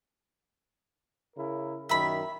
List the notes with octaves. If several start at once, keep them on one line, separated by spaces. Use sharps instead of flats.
C#3 E4 A#4
F#2 A#2 D#3 E5 B5